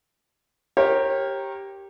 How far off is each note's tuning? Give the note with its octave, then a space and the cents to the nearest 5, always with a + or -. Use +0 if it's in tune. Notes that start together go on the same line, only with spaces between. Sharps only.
G4 +0 A#4 +0 C#5 -35